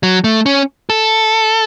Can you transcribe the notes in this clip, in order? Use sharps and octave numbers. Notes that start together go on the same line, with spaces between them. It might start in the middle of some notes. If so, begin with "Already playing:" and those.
F#3
A3
C#4
A4